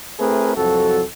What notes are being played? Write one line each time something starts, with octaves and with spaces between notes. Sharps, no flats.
A3 C4 E4 G#4 A#4 B4
C2 F2 F#3 F#4 A4